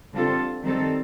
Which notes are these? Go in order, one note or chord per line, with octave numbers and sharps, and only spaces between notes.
D3 G3 C4 F4 A4
D#3 G3 C4 D#4 A4